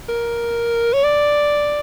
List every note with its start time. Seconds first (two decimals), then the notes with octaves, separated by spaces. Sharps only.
0.09 A#4
0.93 C#5
1.04 D5